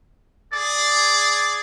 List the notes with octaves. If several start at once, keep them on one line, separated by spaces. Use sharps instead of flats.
G#4 D5